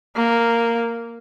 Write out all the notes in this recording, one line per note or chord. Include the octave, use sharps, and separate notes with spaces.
A#3